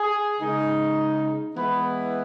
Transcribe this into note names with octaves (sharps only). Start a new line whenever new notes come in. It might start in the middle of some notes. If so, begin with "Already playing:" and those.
Already playing: G#4
C#3 G#3 D#4
E3 G#3 B3 E4 B4